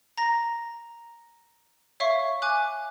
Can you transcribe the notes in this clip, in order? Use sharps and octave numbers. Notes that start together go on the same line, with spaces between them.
A#5 A#6
C#5 E5 F5 C#6
G#5 D6 F#6